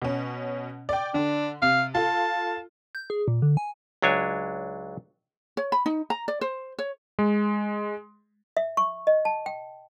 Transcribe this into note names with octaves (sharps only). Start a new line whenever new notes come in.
B2 C#4
D5 G5
D3 D4
C3 F5
F4 A4 A5
G6
G#4
A#2
D3
G#5
C#2 F#3 D4 C#5 G#5
C#5
B5
D#4
A#5
D5
C5
C#5
G#3
E5
C#6
D#5
A5
G5